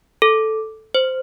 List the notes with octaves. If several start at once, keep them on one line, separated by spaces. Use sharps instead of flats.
A4
C5